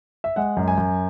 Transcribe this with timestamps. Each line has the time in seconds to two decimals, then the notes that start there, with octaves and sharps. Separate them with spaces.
0.24 E5
0.36 G#3 F#5
0.57 F#2
0.68 G#5
0.78 F#2